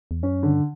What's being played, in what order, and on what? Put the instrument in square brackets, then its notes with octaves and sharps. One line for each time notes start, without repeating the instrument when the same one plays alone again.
[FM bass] E2
[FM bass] F#2 [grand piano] C#4
[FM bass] G2 [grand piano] D3